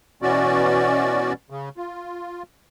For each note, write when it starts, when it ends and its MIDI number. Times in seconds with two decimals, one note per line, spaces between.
0.22 1.33 47
0.22 1.33 52
0.22 1.33 61
0.22 1.33 66
0.22 1.33 74
1.50 1.69 49
1.77 2.43 65